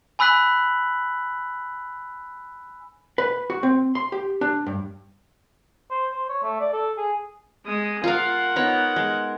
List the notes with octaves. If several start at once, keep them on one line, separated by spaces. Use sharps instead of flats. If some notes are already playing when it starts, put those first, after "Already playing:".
G#5 B5 E6 F#6 B6 F#7
B4
F#4
C4
C6
G4
D4
G2
C5
C5
C#5
A3
D5
A4
G#4
G#3 D#6
F4 A#4 F5 F#5
B3 D#4 C#5
G#3